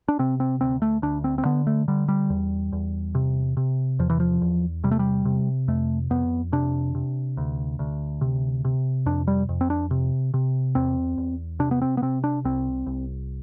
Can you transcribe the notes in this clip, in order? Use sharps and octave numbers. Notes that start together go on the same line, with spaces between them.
D4
C3 C4
C4
D2 C4
A3
D2 D4
C4
C4
D3 B3
A3
D3 G3
G3
E2
E2
C3
C3
E2 F3
E3
F3
E2
C3 G3
A3
G3
C3
F2 A3
F2 B3
C3 D4
C3
D2
D2
C3
C3
F2 D4
G3
F2
C4
D4
C3
C3
E2 C4
E2
C3 D4
B3
C4
B3
C3 C4
D4
C2 C4
C2